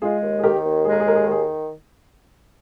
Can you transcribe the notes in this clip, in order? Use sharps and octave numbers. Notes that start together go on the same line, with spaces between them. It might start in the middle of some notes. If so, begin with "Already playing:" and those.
G#3 F4 G#4
D#2
G#4
D#3 G4 A#4
D#2
G#3 G#4
A#4
G#4
D#2 A#4
G#4
D#3 A#4
G#4